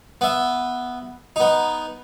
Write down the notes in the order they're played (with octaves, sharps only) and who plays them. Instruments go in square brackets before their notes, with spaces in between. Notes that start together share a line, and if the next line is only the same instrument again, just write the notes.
[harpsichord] B3 E5
B3 D#4